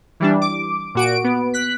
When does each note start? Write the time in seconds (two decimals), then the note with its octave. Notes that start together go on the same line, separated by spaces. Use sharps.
0.20 E3 G3 D4
0.41 D6
0.95 A#2 F#4 D7
1.24 B3
1.54 F#6 B6